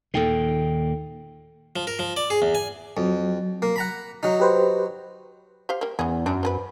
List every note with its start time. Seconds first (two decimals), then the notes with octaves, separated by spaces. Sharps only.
0.14 D#2 A#2 D#3 A4 G5 C7
1.76 F3
1.87 A#4
1.99 F3
2.17 D5
2.30 G#4
2.42 E2
2.55 G#5
2.97 F2 F#3
3.62 A#3
3.76 F#5 A#5 B5
4.23 F#3 D#4
4.40 G4 B4 C5
5.69 G4 C5 F5
5.81 G3 A#3
5.99 E2 C#3 G#4
6.26 F#2 D4
6.43 C4 G#4 B4